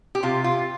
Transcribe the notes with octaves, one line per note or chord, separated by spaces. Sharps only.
G4
C3 F4
F4